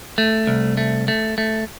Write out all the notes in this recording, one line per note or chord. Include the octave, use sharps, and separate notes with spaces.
A3
C2
A3
A3
A3